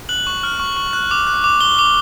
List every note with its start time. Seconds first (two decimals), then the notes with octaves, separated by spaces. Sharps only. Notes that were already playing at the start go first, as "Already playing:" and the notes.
0.09 F#6 F#7
0.27 C#6
0.43 F6
0.60 C#6
0.77 C#6
0.93 F#6
1.11 D6
1.27 F#6
1.44 D6
1.61 D6 G7
1.79 D6